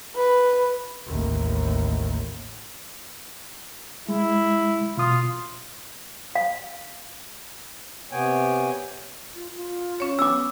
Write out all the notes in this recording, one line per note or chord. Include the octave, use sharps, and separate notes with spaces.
B4
A1 D#2
G#3 E4
B2 F4 D#6
F5
C3 B3 C#5 G5 G#5
F4
F4
C#4 C#5
B3 D6 E6